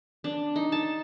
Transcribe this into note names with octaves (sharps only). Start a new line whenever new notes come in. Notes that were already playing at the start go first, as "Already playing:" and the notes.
D4
D#4
A5